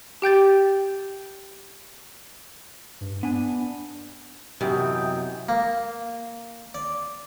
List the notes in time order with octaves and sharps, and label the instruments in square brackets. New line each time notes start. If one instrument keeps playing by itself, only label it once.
[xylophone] G4 G5 G6 A6
[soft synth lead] G2
[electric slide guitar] B3 G#5 [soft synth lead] D4
[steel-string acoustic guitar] F#2 [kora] C3 E3 B3 [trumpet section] D#5 G5
[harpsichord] A#3
D5